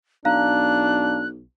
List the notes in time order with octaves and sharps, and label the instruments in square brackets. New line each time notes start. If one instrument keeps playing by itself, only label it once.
[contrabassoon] B1 [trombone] D4 [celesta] F5 A#5 [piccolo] F#6